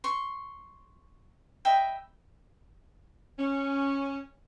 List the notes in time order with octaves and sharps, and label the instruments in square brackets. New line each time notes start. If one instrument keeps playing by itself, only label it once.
[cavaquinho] C6 C#6
D#5 E5 G5 B5
[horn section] C#4